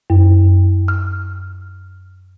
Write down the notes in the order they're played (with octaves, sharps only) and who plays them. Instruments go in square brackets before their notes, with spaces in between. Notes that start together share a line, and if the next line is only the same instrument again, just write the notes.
[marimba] F#2
F6